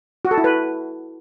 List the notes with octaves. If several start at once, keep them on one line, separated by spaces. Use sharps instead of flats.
F#4
A4
E4
B4